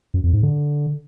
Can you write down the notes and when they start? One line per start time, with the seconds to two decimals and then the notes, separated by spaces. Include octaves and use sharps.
0.14 F#2
0.24 F2
0.33 G#2
0.43 D3